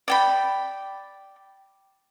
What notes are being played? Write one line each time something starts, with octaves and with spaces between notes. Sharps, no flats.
D5 G5 B5